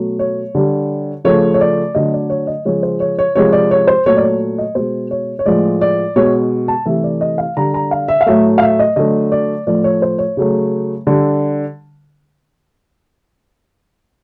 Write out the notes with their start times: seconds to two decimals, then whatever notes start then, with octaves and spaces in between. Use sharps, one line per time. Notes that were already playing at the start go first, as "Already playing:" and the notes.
Already playing: B2 F#3 A3
0.19 C#5
0.55 D3 G3
1.25 C#3 F3 A3 C#5
1.54 C#5
1.61 D5
1.95 D3 F#3 A3 D#5
2.13 D5
2.30 C#5
2.47 D#5
2.65 C#3 F3 G#3 C#5
2.83 C5
3.00 C#5
3.19 C#5
3.35 C3 F3 G#3 C#5
3.53 D5
3.71 C#5
3.87 C5
4.06 A#2 F#3 A3 C#5
4.17 D5
4.23 C#5
4.58 D#5
4.75 B2 G#3 C5
5.11 C#5
5.39 C#5
5.46 A2 F3 G#3 D5
5.81 D5
6.16 B2 G#3 C#5
6.68 A5
6.85 C3 E3 A3 E5
7.04 D5
7.21 D#5
7.38 F5
7.57 D3 G3 A#5
7.74 A#5
7.91 F5
8.08 E5
8.21 F5
8.26 A2 F#3 A3 E5
8.58 F5
8.62 E5
8.79 D#5
8.96 D3 F#3 A3 D#5
9.32 D5
9.67 A2 F3 A3 D5
9.84 C#5
10.02 C5
10.18 C#5
10.37 C#3 F#3 A3
11.07 D3 G3